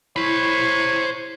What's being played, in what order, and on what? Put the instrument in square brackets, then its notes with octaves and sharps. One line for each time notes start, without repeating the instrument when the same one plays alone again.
[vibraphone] E4 [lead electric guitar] C5 B5 [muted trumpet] C#5